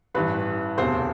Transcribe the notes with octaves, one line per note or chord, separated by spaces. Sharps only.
A1 G2 E3 B4
E1 D2 C3 C5